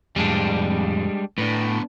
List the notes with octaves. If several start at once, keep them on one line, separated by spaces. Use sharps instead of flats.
F2 A2 G3 G#3 D4
A2 B3 D4